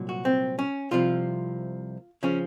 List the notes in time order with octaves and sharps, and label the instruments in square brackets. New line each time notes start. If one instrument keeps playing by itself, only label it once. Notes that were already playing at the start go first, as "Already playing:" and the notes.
Already playing: [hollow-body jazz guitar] C2 A#2 F#3
F#4
C4
C#4
C2 C3 F3 F4
C#3 F3 C#4